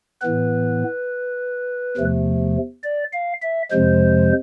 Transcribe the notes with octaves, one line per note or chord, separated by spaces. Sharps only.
A2 E3 B3 B4
E2 C3 F3 A3
D5
F5
E5
F2 C3 F3 G#3 C5